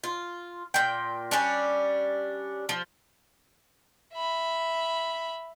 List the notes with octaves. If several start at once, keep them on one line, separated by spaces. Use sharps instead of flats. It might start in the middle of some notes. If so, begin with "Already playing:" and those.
F4
A#2 G5
G3 C#4 D4
F3
E5 B5